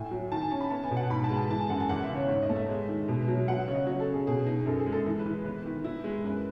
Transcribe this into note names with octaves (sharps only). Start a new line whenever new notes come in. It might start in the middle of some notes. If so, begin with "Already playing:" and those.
Already playing: A2 G#5
F#3
D#3 A5
G#5
C#4 A5
B5
B3 A5
G#5
B2
F#5
G#2 B5
A5
G#3
A5
E3 A5
G#5
F#2 F#5
G#5
E2 F#5
E5
C#3
C#5
G#2 C#5
D#5
A3
E5
G#3
D#3
B2
F#3
F#3 F#5
C#3 C#5
D#5
F#3 C#5
A4
C#4
G#4
B2 G#4
D#4
F#2 A4
G#4
G#3
A4
E3
B4
E3
B3 B4
D#3
E4
G#3
F#2 B4